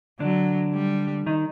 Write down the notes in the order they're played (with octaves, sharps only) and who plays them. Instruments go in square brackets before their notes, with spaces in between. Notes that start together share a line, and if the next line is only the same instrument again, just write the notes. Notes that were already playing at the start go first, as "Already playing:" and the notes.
[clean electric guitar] D3 D4 [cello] F#3
[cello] G3
[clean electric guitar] D#3 D#4